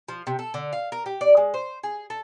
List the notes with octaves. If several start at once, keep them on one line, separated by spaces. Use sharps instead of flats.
F3
C3
A4
D3
F5
A#4
G4
D5
G#3
C5
G#4
A4